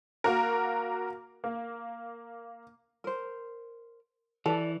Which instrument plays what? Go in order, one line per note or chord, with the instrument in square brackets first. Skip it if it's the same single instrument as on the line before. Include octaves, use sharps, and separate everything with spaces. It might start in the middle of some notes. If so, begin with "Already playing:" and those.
[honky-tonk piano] A#3 F#4 A#4
A#3
[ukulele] A#4 C5
[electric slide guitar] E3 [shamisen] A4 [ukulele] B4 D5